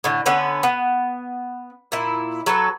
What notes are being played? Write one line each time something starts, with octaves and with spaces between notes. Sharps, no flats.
A2 D3
D3 B3 C#4 B4
B3
A#2 E4
F#3 A4 B4